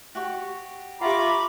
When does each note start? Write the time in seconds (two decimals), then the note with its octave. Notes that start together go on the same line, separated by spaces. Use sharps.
0.15 F#4 G4 C#6
1.01 F4 G4 E5 F#5 A#5 B5 C#6 D6